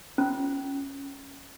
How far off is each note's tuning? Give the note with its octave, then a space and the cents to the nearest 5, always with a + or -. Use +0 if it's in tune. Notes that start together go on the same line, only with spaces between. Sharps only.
C#4 +0 F4 +0